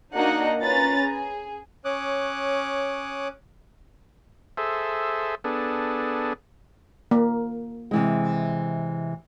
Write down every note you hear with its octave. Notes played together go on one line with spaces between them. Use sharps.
A#3 D4 D#4 F#4 D#5 F#5
C#4 F4 B4 A#5 A6
G#4
C#4 C#5 D6 D#6 F#6
G#4 A4 C5 E5
B3 D4 G#4 A4
A#3
C3 E3 G#3